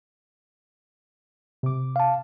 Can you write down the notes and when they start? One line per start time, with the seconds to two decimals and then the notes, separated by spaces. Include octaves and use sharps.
1.63 C3 D6
1.96 F5 A5